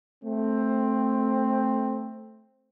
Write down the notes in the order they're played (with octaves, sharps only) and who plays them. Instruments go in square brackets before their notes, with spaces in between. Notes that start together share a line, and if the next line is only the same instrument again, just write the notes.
[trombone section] A3 C4